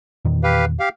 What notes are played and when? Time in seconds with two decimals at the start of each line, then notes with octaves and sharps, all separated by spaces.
0.25 E2 A#2 D#3
0.43 G4 B4 F5
0.79 G4 F5